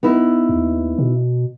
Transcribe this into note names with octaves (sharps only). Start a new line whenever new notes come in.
B3 D#4 E4
D#2
B2